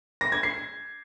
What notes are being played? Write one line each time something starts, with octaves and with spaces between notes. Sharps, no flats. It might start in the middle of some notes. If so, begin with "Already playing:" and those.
A#6
G#6
C7